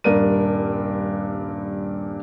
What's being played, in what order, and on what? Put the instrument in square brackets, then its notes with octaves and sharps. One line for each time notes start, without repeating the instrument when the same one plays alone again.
[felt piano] D#1 G2 D4 A#4 D#7